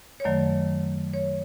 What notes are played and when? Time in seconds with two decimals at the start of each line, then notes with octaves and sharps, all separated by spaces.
0.20 C#5
0.24 F#2 D#3 F#3 A3 D5
1.14 C#5